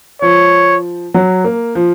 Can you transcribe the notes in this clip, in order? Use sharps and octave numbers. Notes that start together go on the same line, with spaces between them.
F3 C#5
F#3
A#3
F3